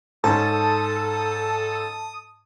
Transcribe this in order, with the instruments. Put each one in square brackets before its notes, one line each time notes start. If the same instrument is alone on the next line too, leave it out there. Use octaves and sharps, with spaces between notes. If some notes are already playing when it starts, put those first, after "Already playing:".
[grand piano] G#2 C#4 [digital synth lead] A4 [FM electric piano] A5 [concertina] D#6